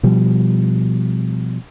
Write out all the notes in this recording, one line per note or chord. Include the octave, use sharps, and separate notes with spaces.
B2 F3 G3